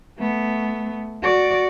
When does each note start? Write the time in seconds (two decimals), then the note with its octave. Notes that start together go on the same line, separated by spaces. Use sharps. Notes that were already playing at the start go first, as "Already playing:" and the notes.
0.18 A3 B3
1.23 F#4 D5